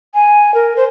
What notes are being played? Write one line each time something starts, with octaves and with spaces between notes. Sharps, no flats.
G#5
A#4
C5